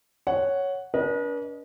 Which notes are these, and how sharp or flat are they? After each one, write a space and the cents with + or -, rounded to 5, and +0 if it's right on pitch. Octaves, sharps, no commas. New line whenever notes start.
C#5 +0 F#5 +0
D4 -40 B4 -45 D#5 -5